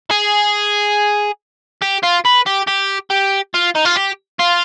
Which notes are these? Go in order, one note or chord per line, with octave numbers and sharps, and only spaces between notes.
G#4
G4
F4
B4
G4
G4
G4
F4
D#4
F4
G4
F4